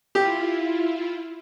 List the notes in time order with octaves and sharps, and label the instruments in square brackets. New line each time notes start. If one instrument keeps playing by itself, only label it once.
[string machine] E4 F4 [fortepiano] G4